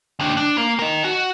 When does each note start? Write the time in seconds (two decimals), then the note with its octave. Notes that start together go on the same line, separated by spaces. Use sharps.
0.20 D#2 D4
0.37 D4
0.58 A#3
0.79 A#4 D#5
1.05 F#4